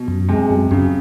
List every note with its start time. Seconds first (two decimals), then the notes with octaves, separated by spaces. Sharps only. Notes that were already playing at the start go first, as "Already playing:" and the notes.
Already playing: B2
0.08 F#2
0.29 C3 G#3
0.50 F#2
0.71 F#2 C#3